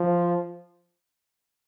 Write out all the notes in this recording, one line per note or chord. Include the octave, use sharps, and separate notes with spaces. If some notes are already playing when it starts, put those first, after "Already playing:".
Already playing: F3